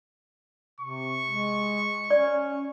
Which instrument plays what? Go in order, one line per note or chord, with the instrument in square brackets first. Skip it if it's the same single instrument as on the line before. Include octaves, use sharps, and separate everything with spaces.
[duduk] C3 [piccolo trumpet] C#6
[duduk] G#3
[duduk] C#4 [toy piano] D5